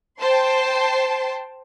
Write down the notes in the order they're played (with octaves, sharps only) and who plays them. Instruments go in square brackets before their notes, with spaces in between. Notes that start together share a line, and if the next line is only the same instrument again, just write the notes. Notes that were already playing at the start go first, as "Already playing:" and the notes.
[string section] C5 G5 A5 C6